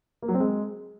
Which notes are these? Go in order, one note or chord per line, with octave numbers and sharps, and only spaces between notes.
A#3
F#3
C4
G#3